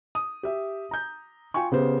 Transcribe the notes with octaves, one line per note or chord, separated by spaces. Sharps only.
D#6
G4 E5
A#5 G6
F4 G5 G#5 C#6
C#3 B3 G4 B4 C5